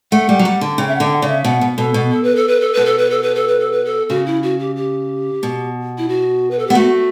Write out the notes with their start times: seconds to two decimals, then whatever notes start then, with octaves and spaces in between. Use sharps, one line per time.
0.12 A3 F#5
0.29 G3
0.39 F#3
0.45 G3
0.61 D3
0.78 C#3 G5
0.88 E5
0.95 F#5
1.00 D3
1.06 G5
1.11 F#5
1.22 C#3 D5
1.28 E5
1.44 B2 F#5
1.61 B2
1.78 B2 A4
1.94 B2
2.11 A4
2.23 B4
2.36 A4
2.48 B4
2.61 A4
2.73 B2 B4
2.86 A4
2.98 B4
3.10 A4
3.23 B4
3.35 A4
3.48 B4
3.60 A4
3.72 B4
3.85 A4
4.10 C#3 F#4
4.26 E4
4.43 F#4
4.60 G4
4.76 G4
5.43 B2
5.98 E4
6.09 F#4
6.51 B4
6.59 A4
6.67 G4
6.70 B3
6.75 A3 F#4